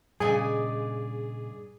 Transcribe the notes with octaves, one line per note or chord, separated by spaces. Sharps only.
G2 A#2 C#3 G3 G#4 D5 D#5 G#5